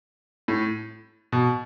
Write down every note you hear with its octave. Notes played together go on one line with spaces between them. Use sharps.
A2
B2